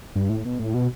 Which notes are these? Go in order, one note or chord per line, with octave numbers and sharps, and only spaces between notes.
G2
A2
B2
A2
B2